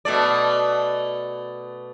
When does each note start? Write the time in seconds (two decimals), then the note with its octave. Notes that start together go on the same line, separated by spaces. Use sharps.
0.05 B2 A3 D5